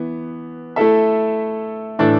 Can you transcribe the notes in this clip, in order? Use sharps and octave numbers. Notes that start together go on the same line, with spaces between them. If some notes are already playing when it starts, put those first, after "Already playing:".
Already playing: E3 B3
A3 E4 A4 E5
A2 E3 D4 A4 D5